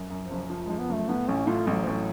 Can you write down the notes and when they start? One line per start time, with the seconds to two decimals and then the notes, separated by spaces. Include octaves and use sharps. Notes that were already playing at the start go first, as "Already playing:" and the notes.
Already playing: F#2
0.10 F#2
0.21 F3
0.31 F#1
0.50 F3
0.65 F3 G#3
0.79 B3
0.89 F#1 A3
1.08 A2 B3
1.28 A1 C#4
1.47 A2 F4
1.67 A1 G#3
1.75 F#3
1.83 F3
1.87 A1 F#3